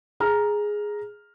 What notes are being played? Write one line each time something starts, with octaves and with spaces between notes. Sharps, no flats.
G#4 A#5 F6